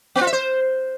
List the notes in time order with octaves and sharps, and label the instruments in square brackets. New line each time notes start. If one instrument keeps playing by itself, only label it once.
[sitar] B3
F4
E5
C5